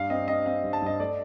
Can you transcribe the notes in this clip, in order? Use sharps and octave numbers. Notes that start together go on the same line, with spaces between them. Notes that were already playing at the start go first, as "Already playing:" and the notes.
Already playing: G2 F5
C4 D#5
C4 D#5
C4 F5
G2
A5
G2 D#5
A3 D5